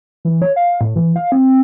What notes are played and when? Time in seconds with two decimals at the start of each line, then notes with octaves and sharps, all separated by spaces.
0.25 E3
0.42 C#5
0.56 F5
0.81 A2
0.96 E3
1.16 F5
1.32 C4